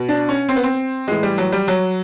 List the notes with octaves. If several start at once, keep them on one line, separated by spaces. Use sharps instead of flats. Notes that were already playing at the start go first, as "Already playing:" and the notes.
Already playing: B2
D4
C#4
C4
B3
C4
A2 E3 G#3
G3
F#3
G3
F#3